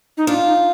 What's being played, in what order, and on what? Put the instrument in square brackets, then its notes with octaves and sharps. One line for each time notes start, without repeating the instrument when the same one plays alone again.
[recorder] D#4
[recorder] D4 [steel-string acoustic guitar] F4
[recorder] D#4